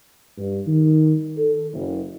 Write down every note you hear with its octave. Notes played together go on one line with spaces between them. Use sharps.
G2
D#3
A4
F#1